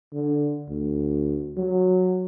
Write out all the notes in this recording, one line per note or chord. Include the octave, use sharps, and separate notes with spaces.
D3
D2
F#3